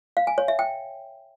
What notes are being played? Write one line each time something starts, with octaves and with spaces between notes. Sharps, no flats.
F5
G#5
C#5
E5
G5